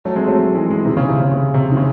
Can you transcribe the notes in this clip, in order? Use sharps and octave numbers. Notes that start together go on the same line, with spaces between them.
F#3 A3
G#3 C4
F#3 A3
E3 G#3
E3 G#3
C3 D#3
C#3
C3
C#3
C#3
C3
D#3
C#3